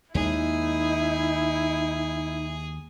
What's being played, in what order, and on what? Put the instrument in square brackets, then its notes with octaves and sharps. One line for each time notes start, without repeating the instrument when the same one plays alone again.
[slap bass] D#2 G#3 [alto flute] D#4 [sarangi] E4 [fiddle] G#4